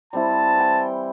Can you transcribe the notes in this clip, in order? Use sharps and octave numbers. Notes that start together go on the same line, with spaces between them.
G3 C4 E4 A5
E3 G5